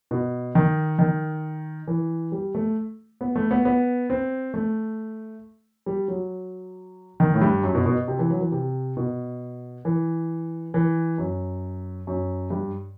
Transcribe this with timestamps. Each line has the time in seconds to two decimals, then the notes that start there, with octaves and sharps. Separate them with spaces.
0.11 B2
0.55 D#3
0.99 D#3
1.87 E3
2.32 G3
2.55 A3
3.21 B3
3.36 A3
3.51 B3
3.65 B3
4.10 C4
4.54 A3
5.86 G3
6.08 F#3
7.20 D#3
7.34 A2
7.42 G2
7.63 F#2
7.75 B2
7.86 B2
8.08 C3
8.19 E3
8.30 F#3
8.41 E3
8.52 C3
8.97 B2
9.85 E3
10.74 E3
11.18 F#2
12.07 F#2
12.50 G2